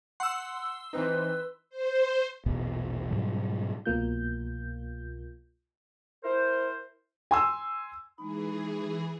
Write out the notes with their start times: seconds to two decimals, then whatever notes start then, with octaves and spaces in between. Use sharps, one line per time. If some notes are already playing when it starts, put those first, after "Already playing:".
0.20 F#5 C6 E6
0.93 E3 C4 D#4 B4
1.70 C5
2.46 A#1 E2 B2 B3
3.10 G#2 B2 F#3 G3
3.86 C2 B2 F3 A#3 F4 G6
6.24 E4 A#4 C5
7.31 G#5 C6 E6
8.18 E3 G#3 A#3 D#4 G#4 B5